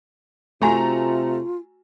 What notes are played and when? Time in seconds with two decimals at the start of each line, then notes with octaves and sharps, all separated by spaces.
0.62 C3 A3 F4 F#4 G#5 A#5 C#6